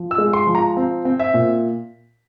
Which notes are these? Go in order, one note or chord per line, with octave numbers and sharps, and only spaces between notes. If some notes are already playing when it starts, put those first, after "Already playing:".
Already playing: F3
E6
G#3
C6
F3
A#5
C4
C4
E5
A#2